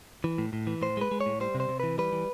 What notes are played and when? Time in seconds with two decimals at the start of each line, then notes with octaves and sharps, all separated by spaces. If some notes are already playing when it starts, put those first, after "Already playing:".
0.24 E3
0.38 A2
0.53 A2
0.67 E3
0.82 A2 C5
0.97 G#3 B4
1.12 G#3
1.21 C#5
1.26 A2
1.40 G3 C5
1.55 C3
1.60 C5
1.69 C3
1.80 E3 B4
1.98 G3 B4
2.13 E3